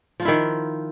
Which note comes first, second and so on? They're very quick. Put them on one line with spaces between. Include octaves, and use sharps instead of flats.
F3 F4 E4 D#3